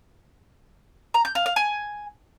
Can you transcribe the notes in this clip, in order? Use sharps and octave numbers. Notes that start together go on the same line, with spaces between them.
A#5
G6
F5
F5
G#5